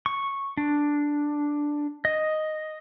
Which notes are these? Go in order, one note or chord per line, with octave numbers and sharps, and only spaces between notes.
C#6
D4
D#5